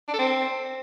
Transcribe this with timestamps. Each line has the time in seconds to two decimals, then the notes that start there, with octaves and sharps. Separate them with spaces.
0.08 D4
0.14 A4
0.19 C4